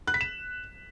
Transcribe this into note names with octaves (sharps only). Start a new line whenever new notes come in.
F#6
B6
E7